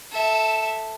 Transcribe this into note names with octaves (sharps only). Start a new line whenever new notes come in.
A4 E5